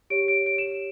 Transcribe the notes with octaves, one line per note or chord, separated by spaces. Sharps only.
G4 C#5 D7
D7
D7
E7